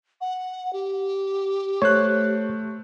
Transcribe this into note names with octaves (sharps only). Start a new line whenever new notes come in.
F#5
G4
A3 C5 C#5 F#6